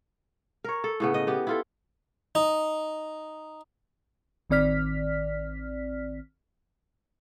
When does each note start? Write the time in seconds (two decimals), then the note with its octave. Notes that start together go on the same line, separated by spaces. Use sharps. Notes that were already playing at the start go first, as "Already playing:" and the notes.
0.64 A#4 C#5
0.84 A4
1.00 A2 C#3 B3
1.14 D#5
1.27 B3 G4
1.47 E4 F4 A4
2.35 D#4
4.50 A1 D#3 C4 D5 F6 B6